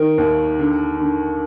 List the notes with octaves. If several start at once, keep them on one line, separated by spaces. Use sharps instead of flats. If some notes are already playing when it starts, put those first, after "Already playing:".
Already playing: D#3 A#4
D#2
D3
D3